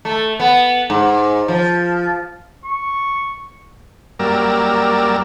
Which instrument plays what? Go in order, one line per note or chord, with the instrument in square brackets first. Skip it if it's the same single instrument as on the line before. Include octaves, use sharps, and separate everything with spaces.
[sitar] A3
B3
G#2
F3
[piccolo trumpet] C#6
[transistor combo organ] F#2 G3 A#3 A#4 D5 E6